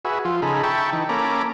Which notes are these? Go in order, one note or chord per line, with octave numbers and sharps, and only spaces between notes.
F#4 G#4 B4 E5
F3 F4
C#3 D#4 G#4 A4 A#5 B5
E5 G5 A5 B5 C#6
E3 D#4
A#3 C#4 A4 A#5 B5 D6